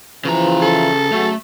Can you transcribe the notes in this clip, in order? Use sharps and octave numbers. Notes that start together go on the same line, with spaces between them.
C#3 E3 F3 A#5
A4
C#3 F#3 A3